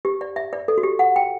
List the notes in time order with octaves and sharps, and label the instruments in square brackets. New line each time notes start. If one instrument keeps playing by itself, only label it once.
[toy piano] G4
D5
E5
D5
A4
F#4
G4
F#5
G5